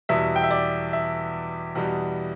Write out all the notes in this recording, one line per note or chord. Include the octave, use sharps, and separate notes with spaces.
E2 B2 G3 E5
G5
E5
D5
E5
E2 B2 G3